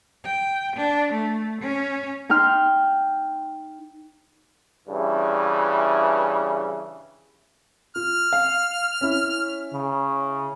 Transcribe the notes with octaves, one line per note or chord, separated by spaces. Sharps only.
G5
D4
A3
C#4
D#4 G5 C6 F6
G2 C#3 E3
F4 F6
F5
C#4 E4
C#3